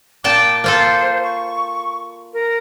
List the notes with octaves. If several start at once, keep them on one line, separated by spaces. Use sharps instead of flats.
A#2 G5 A5 D6
A#3 F4 A4 C5
C#6
A#4